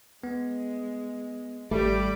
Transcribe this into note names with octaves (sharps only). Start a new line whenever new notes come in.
G#3 B3
G#1 G3 A3 D5 B5